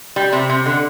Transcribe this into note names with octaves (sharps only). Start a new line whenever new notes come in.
G3
C3
C3
D3